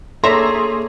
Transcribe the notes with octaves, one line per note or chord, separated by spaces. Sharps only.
A#3 G#4 A4 C#5 D5 E5 A#5 C6